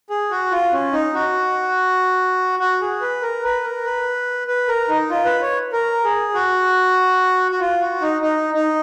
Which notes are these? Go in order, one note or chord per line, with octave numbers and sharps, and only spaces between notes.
G#4
F#4
F4
C#4
D#4
F#4
F#4
G#4
B4
A#4
B4
A#4
B4
B4
A#4
D#4
F4
B4
C#5
A#4
G#4
F#4
F#4
F4
F#4
D#4
D#4
D#4